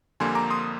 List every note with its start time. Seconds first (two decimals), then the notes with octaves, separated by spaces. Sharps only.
0.20 F2 D3 G3 A#3 G#5 C6
0.35 A#5 D6
0.50 C6 D#6